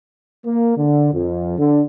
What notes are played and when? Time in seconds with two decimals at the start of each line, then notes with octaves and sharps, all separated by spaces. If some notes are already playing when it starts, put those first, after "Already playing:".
0.45 A#3
0.77 D3
1.13 F2
1.58 D3